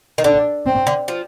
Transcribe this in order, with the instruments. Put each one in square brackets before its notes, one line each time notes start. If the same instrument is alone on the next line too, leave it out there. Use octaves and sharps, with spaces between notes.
[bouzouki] D#3
[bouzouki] D3 [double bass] D4
[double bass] C4
[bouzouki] D3
F3